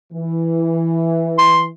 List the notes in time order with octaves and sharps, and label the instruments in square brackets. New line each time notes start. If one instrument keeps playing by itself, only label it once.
[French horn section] E3
[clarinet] C6